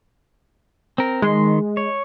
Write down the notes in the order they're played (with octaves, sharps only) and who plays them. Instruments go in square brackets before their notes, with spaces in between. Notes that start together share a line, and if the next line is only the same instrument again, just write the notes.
[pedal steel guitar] C4 A#4
[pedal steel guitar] D#3 C6 [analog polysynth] G#3
[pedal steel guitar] C#5